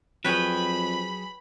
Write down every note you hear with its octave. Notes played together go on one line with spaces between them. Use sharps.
F2 F#3 G#4 B4 C#5 G5 B5